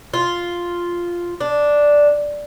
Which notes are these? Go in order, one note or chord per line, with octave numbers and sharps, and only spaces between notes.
F4
D4